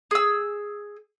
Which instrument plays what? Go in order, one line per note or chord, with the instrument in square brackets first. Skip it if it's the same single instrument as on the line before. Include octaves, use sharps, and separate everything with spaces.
[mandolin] G#4 E6